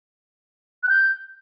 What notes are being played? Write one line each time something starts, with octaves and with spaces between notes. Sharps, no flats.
F#6
G6